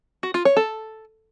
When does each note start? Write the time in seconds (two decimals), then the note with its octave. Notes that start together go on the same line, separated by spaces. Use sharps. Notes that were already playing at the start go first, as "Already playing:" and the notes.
0.23 F#4
0.34 F4
0.45 C#5
0.57 A4